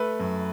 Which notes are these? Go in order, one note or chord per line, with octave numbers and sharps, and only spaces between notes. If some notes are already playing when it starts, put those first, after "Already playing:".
Already playing: A3 B4
F#2